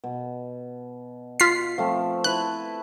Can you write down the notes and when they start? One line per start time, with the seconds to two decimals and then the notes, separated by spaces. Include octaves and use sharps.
0.04 B2
1.40 F4 B6 C7
1.78 F3 A3 C4
2.24 E4 B4 A5 F#6